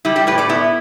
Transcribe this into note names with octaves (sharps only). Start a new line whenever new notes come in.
G3 E4
D4 G4
A2 G4 B4
A4 D5
B3 E4